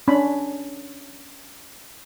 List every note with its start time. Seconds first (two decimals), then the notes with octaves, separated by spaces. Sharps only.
0.08 C#4 D4 B5